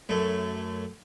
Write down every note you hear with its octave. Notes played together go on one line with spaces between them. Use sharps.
F#2 A3